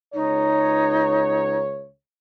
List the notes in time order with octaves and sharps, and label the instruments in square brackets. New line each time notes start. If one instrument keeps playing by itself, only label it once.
[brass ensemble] C#2 C#5 [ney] D#4